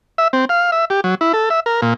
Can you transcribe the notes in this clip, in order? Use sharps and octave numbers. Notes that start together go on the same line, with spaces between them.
E5
C4
F5
E5
G4
F#3
E4
A4
E5
A#4
A#2